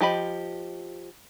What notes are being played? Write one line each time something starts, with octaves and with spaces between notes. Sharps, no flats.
F3 G4 D#5 B5